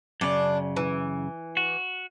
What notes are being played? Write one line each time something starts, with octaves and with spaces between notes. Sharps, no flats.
F#2 C#3 D4
E3
F#4